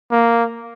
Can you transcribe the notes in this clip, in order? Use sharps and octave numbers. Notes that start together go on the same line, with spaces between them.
A#3